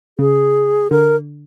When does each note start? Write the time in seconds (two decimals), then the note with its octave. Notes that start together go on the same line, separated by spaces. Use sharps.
0.19 C#3 G#4
0.91 D3 A#4